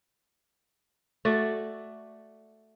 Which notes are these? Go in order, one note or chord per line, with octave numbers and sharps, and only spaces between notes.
A3 F#4 D5